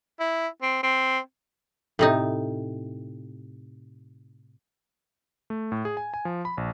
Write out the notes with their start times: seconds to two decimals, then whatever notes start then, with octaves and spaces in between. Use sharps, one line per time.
0.20 E4
0.62 C4
0.83 C4
1.99 A2 C3 D#4
5.50 A3
5.72 A2
5.85 G#4
5.97 G#5
6.14 G#5
6.25 F3
6.45 B5
6.57 A#1